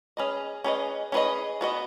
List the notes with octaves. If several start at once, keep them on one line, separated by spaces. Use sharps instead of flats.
C#4 G#4 B4 D#5
C#4 G#4 B4 D#5
C#4 G#4 B4 D#5
B3 F#4 B4 D#5